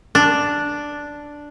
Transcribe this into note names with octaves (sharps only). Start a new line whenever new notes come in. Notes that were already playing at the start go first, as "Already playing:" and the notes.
D4